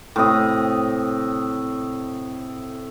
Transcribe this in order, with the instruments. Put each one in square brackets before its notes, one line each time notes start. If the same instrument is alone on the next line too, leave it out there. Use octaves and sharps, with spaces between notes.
[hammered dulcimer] A2 C3 D#5